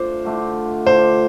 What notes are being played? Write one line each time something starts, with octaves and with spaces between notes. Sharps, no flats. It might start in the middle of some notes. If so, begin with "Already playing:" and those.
Already playing: A3 D4 F4 C5
D3 A3 D4 F4
D3 A3 D4 F4 C5